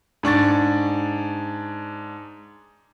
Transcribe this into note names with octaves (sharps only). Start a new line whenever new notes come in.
G#2 D4 C#6 A6